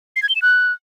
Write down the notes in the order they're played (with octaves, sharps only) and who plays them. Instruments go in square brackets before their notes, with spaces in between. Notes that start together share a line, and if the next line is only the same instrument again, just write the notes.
[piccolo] C7
G#6
G7
E7
F#6